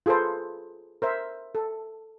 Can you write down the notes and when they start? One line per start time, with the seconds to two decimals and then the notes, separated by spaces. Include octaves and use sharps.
0.06 F4 G#4 A4 B4 C5
1.02 A#4 C5 E5
1.55 A4